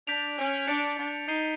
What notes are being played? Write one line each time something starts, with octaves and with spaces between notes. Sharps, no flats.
D4 G6 B6 D7 F7
C#4
D4 A6 C#7 F7
D4
D#4 G6 C7 D#7 G7